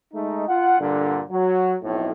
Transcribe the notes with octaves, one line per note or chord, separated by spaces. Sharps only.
G#3 A3 D#4
F4 F#5
G2 A#2 D3
F#3
B1 F2 A2